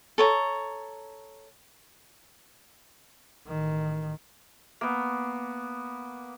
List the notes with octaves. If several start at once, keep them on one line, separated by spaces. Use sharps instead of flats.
A4 C#5 A#5
A1 D#3
A#3 B3